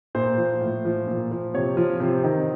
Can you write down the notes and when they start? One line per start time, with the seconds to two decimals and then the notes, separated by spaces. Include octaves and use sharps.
0.15 A#2 C5
0.38 F3
0.61 A2
0.85 F3
1.07 A#2
1.31 F3
1.54 C3 C#5
1.77 F3
2.00 C3 C5
2.24 D#3